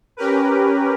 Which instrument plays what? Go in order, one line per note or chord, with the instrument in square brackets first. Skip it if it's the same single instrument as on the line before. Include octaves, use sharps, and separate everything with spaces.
[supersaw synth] C#4 G4 A#4 B4